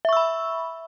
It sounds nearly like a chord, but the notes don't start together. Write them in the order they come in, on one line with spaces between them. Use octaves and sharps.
E5 C#6 E6 B5